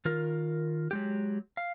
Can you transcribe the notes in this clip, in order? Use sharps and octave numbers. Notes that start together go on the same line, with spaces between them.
D#3 F4 A#4
F#3 G#3 G4
F5